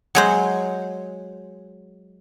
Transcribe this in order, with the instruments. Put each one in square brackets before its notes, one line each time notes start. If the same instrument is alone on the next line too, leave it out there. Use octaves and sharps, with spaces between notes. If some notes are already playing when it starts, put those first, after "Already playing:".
[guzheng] F#3 G#3 C5